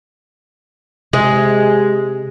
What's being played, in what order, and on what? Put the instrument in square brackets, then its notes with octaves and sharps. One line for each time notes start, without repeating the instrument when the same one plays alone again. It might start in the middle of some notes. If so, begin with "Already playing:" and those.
[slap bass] C3 [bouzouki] G#3